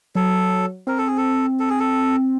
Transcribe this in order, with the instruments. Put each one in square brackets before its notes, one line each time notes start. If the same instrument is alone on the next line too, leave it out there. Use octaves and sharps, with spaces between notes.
[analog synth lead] F#3 [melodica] A4
[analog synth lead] C4 [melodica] A#4
[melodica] A4
G#4
A4
A4
G#4
A4